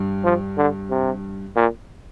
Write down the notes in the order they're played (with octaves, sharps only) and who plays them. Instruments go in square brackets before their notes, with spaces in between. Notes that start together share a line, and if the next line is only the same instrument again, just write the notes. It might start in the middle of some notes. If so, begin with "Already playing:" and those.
Already playing: [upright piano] G2
[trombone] F3
D3
C3
A#2